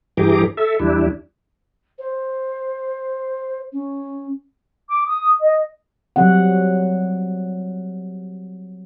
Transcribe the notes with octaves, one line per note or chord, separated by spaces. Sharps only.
G2 E3 G4 G#4 A#5 D6
A4 E5
E2 G3 D4 E4
C5
C#4
D6
D#6
D#5
F#3 G3 C4 F#5